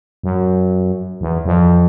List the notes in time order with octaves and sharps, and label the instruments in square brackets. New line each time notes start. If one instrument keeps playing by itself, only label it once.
[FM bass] F#2
E2
F2